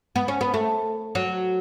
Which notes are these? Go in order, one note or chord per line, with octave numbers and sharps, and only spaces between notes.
B3
C#4
B3
A3
F#3